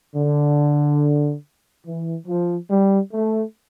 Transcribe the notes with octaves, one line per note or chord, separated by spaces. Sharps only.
D3
E3
F3
G3
A3